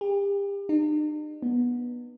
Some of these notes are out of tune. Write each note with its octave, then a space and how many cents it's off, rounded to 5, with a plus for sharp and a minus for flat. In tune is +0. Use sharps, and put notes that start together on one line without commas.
G4 +35
D#4 -45
B3 -20